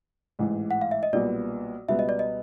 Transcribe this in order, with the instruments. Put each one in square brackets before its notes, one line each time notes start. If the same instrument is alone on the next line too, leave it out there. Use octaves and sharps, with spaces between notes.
[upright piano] A1 G#2 E3
[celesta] F#5
F5
E5
D#5
[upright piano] B1 A#2 G3 B3 [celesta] D5
[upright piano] C#2 B2 G3 B3 [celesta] E5
[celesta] D#5
D5
D#5